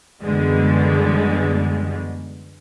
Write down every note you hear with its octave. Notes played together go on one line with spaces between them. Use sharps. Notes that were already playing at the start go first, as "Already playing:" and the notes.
F#2 B2 D3 E3 G3 G#3